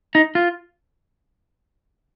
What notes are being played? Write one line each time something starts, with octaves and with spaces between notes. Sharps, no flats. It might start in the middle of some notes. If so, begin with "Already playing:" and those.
D#4
F4